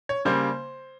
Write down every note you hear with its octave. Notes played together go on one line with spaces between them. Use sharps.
C#5
C#3 G3 A#3 C5